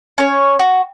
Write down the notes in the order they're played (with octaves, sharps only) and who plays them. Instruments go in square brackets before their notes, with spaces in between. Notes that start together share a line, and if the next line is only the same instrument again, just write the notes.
[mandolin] C#4 C#5
F#4